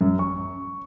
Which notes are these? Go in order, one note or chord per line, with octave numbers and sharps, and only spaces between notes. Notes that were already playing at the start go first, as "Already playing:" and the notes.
F#2
C#6